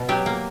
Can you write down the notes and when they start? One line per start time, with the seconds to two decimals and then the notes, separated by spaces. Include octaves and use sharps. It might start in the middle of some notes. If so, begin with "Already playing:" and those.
Already playing: B2
0.09 F#3 G4
0.26 A#3